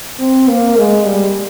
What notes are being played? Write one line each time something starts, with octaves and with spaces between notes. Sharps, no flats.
C4
A#3
G#3
G3